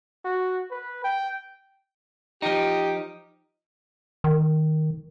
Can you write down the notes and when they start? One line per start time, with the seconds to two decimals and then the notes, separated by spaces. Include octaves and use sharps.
0.25 F#4
0.71 B4
1.04 G5
2.42 F3 D#4 G4
4.24 D#3